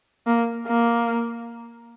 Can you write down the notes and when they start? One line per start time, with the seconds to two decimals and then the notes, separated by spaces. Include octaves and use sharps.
0.27 A#3
0.67 A#3